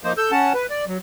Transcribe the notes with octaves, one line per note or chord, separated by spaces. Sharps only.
F3 A#3 D#4 C5
A4 E6 G6
C#4 F#5 A5
B4
D5
F#3